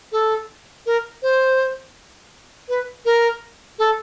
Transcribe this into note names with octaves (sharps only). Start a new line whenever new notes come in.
A4
A#4
C5
B4
A#4
A4